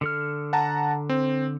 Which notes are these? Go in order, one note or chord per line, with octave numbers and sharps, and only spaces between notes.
D3 A4 F6
F#5 A5 A#5
C4